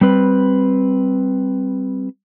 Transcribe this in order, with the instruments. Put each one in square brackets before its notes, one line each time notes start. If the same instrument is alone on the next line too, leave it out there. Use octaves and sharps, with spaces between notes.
[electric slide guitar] G3 C4 B4